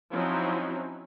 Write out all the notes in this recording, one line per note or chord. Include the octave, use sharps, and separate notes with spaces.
F3 F#3 C4 C#4 D#4 E4